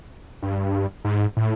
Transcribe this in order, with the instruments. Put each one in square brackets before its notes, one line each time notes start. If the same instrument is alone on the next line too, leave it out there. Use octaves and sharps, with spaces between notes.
[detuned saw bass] G2
G#2
A2